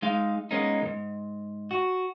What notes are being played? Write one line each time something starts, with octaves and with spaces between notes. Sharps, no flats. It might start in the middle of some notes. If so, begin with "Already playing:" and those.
G#3 D#4 F5
G#3 A#3 B3 C#4 D#4
D2 G#2
F#4